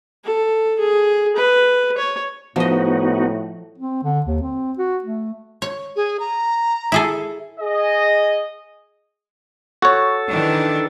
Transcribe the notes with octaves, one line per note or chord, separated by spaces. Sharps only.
A4
G#4
B4
C#5
A2 F3 B3 D#4 F#4 D#5
C4
D3
D#2
C4
F#4
A3
C#5
G#4
A#5
E4 G#4 A4
G#4 D#5
F#4 A4 C#5
D#3 E3 D4